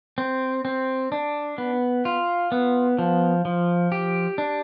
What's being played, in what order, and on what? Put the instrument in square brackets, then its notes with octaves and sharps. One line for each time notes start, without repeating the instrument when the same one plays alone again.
[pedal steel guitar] C4
C4
D4
B3
F4
B3
F3
F3
G4
D4